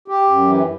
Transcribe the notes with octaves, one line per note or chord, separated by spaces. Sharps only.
G4
F#2
E3